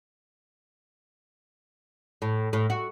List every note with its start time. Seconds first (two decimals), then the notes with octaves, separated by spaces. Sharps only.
2.22 A2
2.53 A2
2.70 F#4